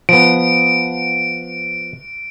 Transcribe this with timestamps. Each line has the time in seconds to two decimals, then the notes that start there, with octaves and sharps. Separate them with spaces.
0.09 F3 B3 D7